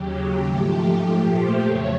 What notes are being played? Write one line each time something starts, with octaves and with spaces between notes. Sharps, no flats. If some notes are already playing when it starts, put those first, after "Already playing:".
Already playing: D#2 C#3 F#3 G4
G4
G#2 F3 A3
G4
A#2 F3 A3 G4
C5
F2 C#3 F#3 A3 C#5